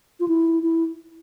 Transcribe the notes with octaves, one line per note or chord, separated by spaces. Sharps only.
F4
E4
E4